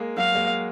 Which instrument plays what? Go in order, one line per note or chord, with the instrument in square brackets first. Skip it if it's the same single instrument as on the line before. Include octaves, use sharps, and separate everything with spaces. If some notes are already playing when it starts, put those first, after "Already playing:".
Already playing: [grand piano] G#3 A#3
[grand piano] F#3 G#3 [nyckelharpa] F5
[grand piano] G#3 A#3